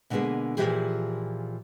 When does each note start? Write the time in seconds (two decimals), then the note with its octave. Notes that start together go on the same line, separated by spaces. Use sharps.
0.10 B2 D3 G#3 A#3 B3 G#4
0.57 A#2 C#3 E3 F3 G4 G#4